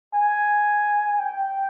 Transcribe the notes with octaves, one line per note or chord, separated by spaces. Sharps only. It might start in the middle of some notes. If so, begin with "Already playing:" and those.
G#5
G5